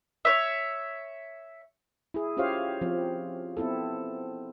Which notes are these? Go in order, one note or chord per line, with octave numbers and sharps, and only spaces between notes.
C#5 E5
E4 G#4
C#4 F4 G4 C5 C#5 F5
F3 C4
B3 C4 E4 A4